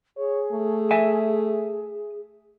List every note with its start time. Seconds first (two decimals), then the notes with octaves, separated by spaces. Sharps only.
0.17 G#4 C#5
0.52 A3
0.91 E5 G#5